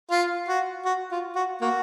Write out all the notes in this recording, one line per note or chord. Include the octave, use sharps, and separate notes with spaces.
F4
F#4
F#4
F4
F#4
A#3 F#4